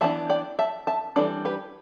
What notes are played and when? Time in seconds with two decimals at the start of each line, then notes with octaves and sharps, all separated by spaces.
0.01 E3 B3 D4 E5 A5
0.30 D5 G5
0.59 E5 A5
0.87 E5 A5
1.16 E3 G3 D4 A4 D5
1.45 G4 B4